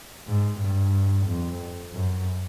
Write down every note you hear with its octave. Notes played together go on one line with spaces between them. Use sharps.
G#2
G2
F2
F#2